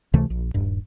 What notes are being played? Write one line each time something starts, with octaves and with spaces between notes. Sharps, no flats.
C#2 C3 E3 A3
A#1
D#1 G2